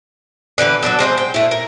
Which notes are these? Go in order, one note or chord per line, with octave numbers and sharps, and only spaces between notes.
D3 E3 G4 B4
F#3 B3 D4 A4
G#3 C4 E4 C5
G5
A3 E4
A#4